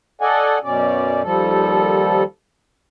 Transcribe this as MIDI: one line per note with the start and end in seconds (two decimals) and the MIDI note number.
0.21 0.58 69
0.21 0.58 74
0.21 0.58 75
0.21 0.58 78
0.21 0.58 80
0.64 1.22 42
0.64 1.22 47
0.64 1.22 61
0.64 1.22 74
1.23 2.23 39
1.23 2.23 53
1.23 2.23 55
1.23 2.23 69